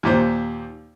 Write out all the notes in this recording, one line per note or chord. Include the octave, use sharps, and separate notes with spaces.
D#2 A#2 C5